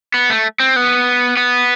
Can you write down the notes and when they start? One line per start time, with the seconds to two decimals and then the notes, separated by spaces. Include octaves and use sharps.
0.14 B3
0.30 A3
0.60 C4
0.76 B3
1.37 B3